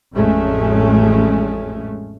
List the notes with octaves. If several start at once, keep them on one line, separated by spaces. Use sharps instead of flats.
A1 F2 G#3 A3 C#4